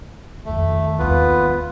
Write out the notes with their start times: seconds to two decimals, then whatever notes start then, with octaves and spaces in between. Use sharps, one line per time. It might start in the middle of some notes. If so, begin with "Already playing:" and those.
0.46 F2 D#3 A3
0.99 D#2 B3 E4 F4 B4
1.42 D2